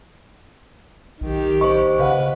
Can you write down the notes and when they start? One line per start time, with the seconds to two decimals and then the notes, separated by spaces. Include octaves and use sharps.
1.21 B1 D#3 G4
1.61 C5 D#5 C#6
1.99 C#3 B4 F5 F#5